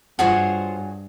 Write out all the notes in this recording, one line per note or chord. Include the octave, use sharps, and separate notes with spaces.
G2 F4 F#4 G#4 C5 C#5 F#5